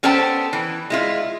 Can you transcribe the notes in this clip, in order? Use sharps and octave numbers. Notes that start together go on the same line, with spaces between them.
B3 C#4 A4 C5 G5 A5
E3
G#3 E4 F4